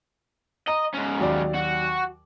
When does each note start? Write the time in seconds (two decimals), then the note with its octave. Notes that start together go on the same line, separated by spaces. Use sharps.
0.68 D#5 A#5
0.94 G#2 C#4
1.19 D#2 F#3 D5
1.55 F#4